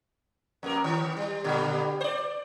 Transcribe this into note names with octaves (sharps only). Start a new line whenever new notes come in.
F2 A#3 A#4
D#3
G3
A#2 D3 G3
C5 D5